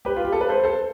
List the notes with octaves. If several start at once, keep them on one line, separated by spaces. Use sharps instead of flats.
G4 B4
F4
G4
A4
B4
A4 C5
A4 C5